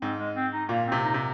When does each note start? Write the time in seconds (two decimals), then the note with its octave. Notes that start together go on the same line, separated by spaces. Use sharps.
0.01 G#2 C4
0.18 G#3
0.35 C4
0.53 D#4
0.69 A#2 A#3
0.86 C4
0.92 C3
1.04 D#4
1.14 C3